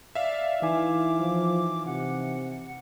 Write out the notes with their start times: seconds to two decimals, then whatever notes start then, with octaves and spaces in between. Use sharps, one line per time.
0.15 D5 E5 F5
0.62 E3 D#4 E4 G#5 D6
1.19 F3
1.86 C3 F#5